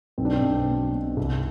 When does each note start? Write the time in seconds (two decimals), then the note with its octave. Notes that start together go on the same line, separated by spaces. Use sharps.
0.18 B1 C4
0.25 D4
0.33 C4
0.42 B1
0.68 B2
0.92 B2
1.17 C2